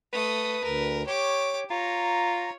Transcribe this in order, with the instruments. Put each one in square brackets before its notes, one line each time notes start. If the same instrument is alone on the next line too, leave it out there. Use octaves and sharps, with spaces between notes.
[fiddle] A3 D#6 [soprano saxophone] B4
[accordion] D2 [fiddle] A#4
[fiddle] G4 D6 [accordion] C#5
[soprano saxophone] F4 [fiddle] C#5 [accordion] A#5